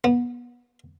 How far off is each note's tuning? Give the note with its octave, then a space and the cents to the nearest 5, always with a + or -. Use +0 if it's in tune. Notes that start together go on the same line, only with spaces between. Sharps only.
B3 -25